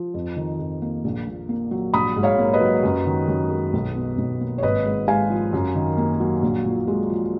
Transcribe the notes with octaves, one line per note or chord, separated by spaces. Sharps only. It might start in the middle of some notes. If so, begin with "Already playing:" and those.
Already playing: F3
F2
D#3
F2
A#3
A#1
A#2
A#3
F#3
A#1 B5 D#6
G#2
C#5 F5
A#3
B4 D#5
F#3
F#2
D#3
F#2
G#3
B1
B2
B1
A#3
C#5
G#1 B4 D#5
G#2
G#3 F5 G#5
F3
F#2
D#3
A#3
F#3
A#1
A#2
G#3
F3